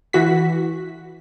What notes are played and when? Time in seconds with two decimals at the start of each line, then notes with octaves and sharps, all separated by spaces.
0.13 E3 F#4 B6